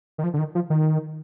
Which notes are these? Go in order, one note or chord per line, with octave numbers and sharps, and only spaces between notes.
D#3
F3
D3
D#3
F3
D#3